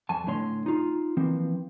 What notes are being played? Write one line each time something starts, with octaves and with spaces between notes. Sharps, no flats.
F2 G#5 A5
A2 D3 A3 C#5 C6
D#4 F4
E3 F3 A#3 C4